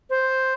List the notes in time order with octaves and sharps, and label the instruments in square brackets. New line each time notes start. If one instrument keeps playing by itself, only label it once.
[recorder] C5